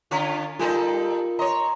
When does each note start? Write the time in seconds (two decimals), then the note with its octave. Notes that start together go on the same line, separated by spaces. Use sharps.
0.11 D3 C#4 F4
0.59 G3 D#4 F4 A4 A#4
1.39 C#5 D#5 A#5 C6